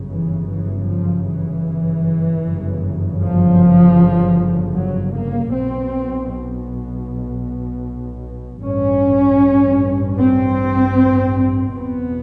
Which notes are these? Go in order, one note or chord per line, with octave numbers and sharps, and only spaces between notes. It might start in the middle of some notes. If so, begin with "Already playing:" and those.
Already playing: G1 F#2 C#3
E3
E3
F3
E3
G1 F#2 C#3
F3
F#3
A#3
B1 B2 C4
A1 G2 C#4
C4
F#1 E2 B2 B3